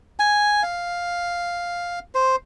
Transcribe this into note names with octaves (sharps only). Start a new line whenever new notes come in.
G#5
F5
C5